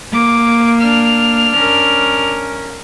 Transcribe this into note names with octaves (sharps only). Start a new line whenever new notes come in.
A#3 D6
D4 F6
C#4 A#4